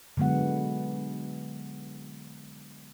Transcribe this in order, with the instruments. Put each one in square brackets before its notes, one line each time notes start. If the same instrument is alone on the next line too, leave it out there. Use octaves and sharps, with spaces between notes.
[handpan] D3 F#3 G#3 B3 F#5